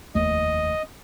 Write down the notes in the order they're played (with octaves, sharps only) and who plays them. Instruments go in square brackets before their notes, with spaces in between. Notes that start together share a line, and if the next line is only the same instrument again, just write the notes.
[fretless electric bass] F1 D#2 A3 [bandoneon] D#5